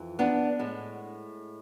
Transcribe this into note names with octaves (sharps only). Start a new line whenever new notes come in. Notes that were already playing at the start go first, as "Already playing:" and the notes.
Already playing: F2 E3
B3 D4
A2 G#3